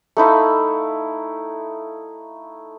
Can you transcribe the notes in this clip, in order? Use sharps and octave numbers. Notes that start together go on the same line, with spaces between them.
A3 D#4 E4 F5